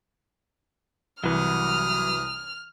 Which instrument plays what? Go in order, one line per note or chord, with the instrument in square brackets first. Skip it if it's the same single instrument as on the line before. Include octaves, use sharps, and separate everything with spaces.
[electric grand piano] C2 E3 [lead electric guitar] F#3 B4 [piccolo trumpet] D#6 [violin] F6